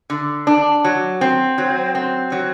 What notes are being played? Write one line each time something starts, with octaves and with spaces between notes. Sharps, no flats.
D3
D4
F#3
C4
F#3
C4
F#3